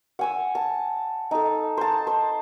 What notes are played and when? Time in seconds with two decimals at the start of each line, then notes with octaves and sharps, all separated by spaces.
0.19 F#5 G#5 E6
0.55 A5
1.31 D#4 A4
1.77 C5 A5
2.07 C5